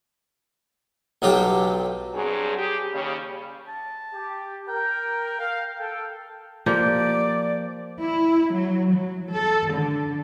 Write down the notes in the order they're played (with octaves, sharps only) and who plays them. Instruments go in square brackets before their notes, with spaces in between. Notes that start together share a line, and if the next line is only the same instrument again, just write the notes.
[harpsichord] B1 F#3 F4 G4
[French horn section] G2 F#3 C4 G#4
G4 G#4
D#2 C#3 G3
[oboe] A5
[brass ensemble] G4
[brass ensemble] A#4 [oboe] G5
[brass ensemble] F5
A4 G5
[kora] F3 A#3 G4 [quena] D5
[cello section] E4
F#3
F#3
A4
D3